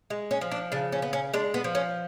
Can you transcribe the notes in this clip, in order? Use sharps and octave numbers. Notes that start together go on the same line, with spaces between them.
G#3
C#4
F3
D4
C#3 D4
C#4
B3
C#4
G#3 D4
B3
F3
C#4